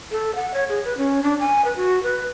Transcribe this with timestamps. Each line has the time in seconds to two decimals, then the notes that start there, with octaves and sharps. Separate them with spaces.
0.11 A4
0.35 F#5
0.54 C#5
0.69 G#4
0.85 B4
0.97 C#4
1.23 D4
1.40 G#5
1.65 B4
1.76 F#4
2.03 B4